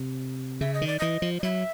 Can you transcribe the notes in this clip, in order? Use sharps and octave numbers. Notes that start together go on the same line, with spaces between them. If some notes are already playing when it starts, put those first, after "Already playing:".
Already playing: C3
C#3 E5
D#5
D#3
D5
E3 D#5
F3
D#5
F#3 E5